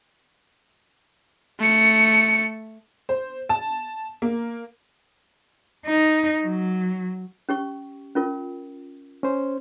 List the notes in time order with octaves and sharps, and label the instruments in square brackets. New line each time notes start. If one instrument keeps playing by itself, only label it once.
[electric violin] A3 C#7
[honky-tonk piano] C5
A5
A#3
[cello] D#4
F#3
[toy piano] C#4 G4 C#6
C#4 F4 A#4
[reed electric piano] C#4 C5